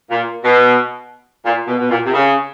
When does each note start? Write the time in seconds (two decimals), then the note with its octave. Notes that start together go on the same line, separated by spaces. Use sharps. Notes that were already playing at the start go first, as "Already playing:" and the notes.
0.10 A#2
0.44 B2
1.45 A#2
1.67 B2
1.78 B2
1.90 A#2
2.06 C3
2.13 C#3